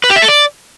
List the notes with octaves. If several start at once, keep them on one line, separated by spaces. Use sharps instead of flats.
B4
G4
E5
A4
D5